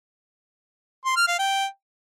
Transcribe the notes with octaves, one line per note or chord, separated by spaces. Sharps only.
C6
F6
F5
G5